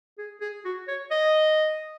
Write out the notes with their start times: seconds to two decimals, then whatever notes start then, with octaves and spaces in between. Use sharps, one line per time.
0.18 G#4
0.41 G#4
0.65 F#4
0.88 C#5
1.11 D#5